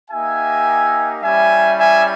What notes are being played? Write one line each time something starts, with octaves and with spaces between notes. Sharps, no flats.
A#3 D#4 G4 E5 G#5
G3 C#4 E4 G4 E5 G#5
E5 G#5